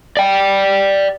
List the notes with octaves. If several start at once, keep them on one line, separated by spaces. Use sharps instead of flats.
D5 G5